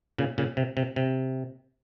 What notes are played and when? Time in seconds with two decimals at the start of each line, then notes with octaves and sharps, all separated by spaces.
0.18 A#2 C#3
0.38 A#2 C#3
0.57 C3
0.77 C3
0.96 C3